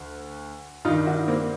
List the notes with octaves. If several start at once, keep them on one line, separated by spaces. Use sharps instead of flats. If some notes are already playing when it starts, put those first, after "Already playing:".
Already playing: D2
G2 D#3 D#4 F4
E4 F#4
A#3 C4